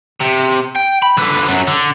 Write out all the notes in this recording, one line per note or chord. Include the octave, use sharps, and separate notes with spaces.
C3
G5
B5
D3 B4
F#2 F#3
D3